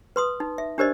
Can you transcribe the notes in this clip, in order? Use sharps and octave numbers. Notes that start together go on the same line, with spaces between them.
B4 C6 D#6
D#4
E5
D4 G4 A#4 C5 D5 D#5